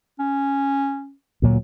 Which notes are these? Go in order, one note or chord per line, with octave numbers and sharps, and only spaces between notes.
C#4
D2 A#2 F#3